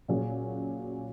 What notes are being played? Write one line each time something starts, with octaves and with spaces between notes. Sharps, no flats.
A#2 F#3 C#4 G#4